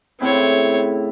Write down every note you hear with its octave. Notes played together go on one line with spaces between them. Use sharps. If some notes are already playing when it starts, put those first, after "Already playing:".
A2 C#3 C4 E4 C#5